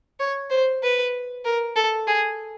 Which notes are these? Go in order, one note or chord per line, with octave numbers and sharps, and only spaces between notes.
C#5
C5
B4
A#4
A4
G#4